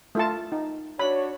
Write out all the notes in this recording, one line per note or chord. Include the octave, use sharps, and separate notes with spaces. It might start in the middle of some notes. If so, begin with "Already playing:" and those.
A3 F4 A5
D#4
D4 F#4 C#5 B5